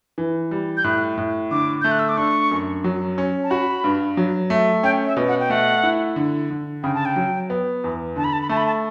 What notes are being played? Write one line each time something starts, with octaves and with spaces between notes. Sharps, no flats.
E3
G3
G6
A2 F#6
A2
D3 D6
A3 G6
F#6
E6
D6
D4 C#6
F#2
F#3
C#4
A5
F#4 B5
G2
F#3
A3
C#4 G5
E5
B2
F#5
G5
A3 F#5
E4
D3
D3
C#3 G5
A5
G5
F#3
B3
E2
D3 A5
B5
A5
B5
A3 A5
B5
A5